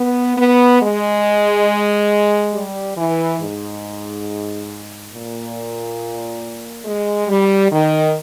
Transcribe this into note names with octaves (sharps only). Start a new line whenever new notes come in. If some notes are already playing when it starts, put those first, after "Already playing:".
Already playing: B3
B3
G#3
G3
E3
G#2
A#2
G#3
G3
D#3